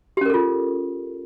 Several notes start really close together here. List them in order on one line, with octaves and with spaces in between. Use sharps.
G4 C#4 A#4 A4 F4